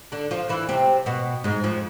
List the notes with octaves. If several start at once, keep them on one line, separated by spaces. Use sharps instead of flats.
D3 D4
F3 F4
E3 E4
C3 C4
B2 B3
G#2 G#3
F2 F3